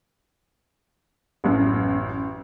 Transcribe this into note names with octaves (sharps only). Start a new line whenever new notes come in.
A1 F#2